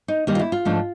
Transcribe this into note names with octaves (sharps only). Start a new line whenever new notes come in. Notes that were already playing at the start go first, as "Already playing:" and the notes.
D#4
D#3 G3 A#3 D#4
F4
E4
F4
G#2 F3 A3 D4